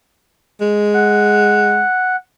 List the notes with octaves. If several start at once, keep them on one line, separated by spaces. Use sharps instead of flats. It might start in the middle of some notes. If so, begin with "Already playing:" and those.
G#3
F#5